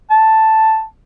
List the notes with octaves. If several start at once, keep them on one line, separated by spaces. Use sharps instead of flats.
A5